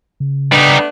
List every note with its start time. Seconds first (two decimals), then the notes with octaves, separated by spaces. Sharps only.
0.20 C#3
0.52 G3 A3 B3 D4 D#4